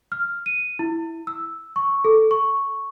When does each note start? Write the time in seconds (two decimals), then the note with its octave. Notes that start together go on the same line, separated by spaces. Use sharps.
0.12 F6
0.46 D#7
0.79 E4
1.27 E6
1.76 C#6
2.05 A4
2.31 C#6